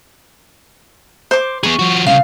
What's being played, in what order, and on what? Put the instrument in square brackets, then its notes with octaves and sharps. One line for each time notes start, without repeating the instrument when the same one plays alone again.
[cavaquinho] C5 D6
[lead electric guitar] B3 G#4 [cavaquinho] C#6
[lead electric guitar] F3 F#4
[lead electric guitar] C2 C#3 [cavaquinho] F5